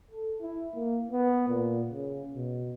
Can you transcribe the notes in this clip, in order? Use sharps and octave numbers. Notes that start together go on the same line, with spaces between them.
A4
E4
A#3
B3
A#2
C#3
B2